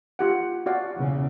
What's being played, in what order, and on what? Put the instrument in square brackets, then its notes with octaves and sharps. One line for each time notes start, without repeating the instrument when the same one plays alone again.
[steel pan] F4 G4 F#5
F#4 D5 F5
[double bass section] E2 C#3